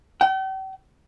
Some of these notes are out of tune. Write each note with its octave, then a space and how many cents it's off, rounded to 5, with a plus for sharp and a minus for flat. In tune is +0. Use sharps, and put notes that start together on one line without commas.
G5 -40